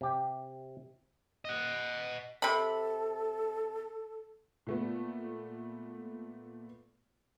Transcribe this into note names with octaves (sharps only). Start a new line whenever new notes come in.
C3 G4
D#5 F#5
C3 A4 B5
A#2 A3 B3